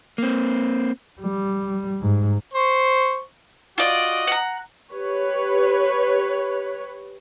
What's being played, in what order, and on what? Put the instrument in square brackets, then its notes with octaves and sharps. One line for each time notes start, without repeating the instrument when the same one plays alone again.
[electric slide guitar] A#3 C4
[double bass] G3
G#2
[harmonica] C5 C#6
[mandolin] F4 D5 [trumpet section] F#4 D#5
[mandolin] F#5 A#5
[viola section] G4 B4 C#5